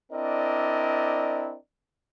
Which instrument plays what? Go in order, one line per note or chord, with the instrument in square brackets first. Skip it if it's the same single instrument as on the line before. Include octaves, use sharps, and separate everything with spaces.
[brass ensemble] C4 D4 E4 A#4 D5 D#5